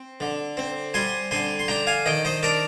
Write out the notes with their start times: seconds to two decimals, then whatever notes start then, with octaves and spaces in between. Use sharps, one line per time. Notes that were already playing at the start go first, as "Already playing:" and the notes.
Already playing: C4
0.20 D3
0.57 C4
0.94 G3 G#5 C6
1.31 D3 G#5 C6
1.59 C6
1.68 D4 G5 A#5
1.87 F5 G#5
2.06 D#3 D#5 G5
2.25 C5 D#5
2.43 D4 A#4 D5